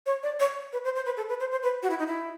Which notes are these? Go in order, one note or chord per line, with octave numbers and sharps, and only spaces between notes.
C#5
D5
C#5
B4
C5
C5
B4
A4
B4
C5
C5
B4
F#4
E4
D#4
E4